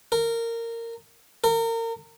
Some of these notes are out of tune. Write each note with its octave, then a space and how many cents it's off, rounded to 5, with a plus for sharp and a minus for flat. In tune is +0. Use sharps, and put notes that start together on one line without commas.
A#4 -15
A#4 -30